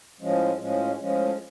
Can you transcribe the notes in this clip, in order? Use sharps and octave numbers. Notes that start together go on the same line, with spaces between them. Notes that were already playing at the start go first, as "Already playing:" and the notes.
A2 F3 G#3 C#4
A2 F3 G#3 C#4
A2 F3 G#3 C#4